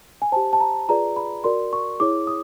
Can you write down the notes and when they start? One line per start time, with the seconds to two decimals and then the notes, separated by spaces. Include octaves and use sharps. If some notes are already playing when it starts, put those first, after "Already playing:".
0.22 G#5
0.32 G4 C5 A5
0.53 A5
0.61 A#5
0.89 F4 G#4 B4 D5 A#5
1.16 B5
1.44 F#4 A#4 D5 C6
1.73 C#6
2.00 E4 G#4 C#5 D6
2.27 D#6